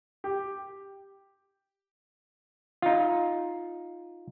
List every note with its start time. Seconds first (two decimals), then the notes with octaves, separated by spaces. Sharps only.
0.24 G4
2.82 D#4 F4